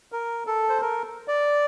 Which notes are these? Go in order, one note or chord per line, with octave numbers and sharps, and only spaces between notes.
A#4
A4
C5
A#4
D5